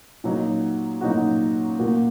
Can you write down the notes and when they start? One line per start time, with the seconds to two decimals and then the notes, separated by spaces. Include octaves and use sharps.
0.24 A#2 F#3 D#4 F#4
1.01 A#2 F#3 D#4 F#4
1.79 A#2 A#3 F#4